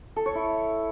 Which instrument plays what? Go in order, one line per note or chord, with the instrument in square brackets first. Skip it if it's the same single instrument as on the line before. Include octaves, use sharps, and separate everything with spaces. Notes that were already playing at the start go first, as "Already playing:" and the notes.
[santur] A4
C#5
E4